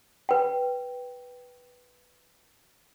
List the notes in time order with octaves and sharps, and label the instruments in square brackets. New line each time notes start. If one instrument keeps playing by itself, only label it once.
[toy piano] B4 G5